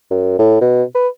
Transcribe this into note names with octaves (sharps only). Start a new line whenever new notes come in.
F#2
A2
B2
B4